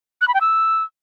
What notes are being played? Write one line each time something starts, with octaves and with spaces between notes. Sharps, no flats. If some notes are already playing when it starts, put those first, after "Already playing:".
F#6
B5
G5
E6